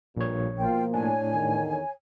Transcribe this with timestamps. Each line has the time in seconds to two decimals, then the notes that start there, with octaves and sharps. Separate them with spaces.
0.17 A#1 G2 A#2 C#5
0.58 B2 F3 A#3 F4 G5
0.94 A2 D4 C#5 G#5
1.32 E2 D3 D#3